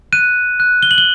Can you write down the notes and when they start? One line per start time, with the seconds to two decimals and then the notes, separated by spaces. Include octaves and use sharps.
0.13 F#6 D#7
0.60 F#6
0.83 G7
0.91 F#7
0.98 G7